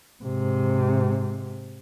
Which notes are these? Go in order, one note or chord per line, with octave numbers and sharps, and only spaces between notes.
G#2 C3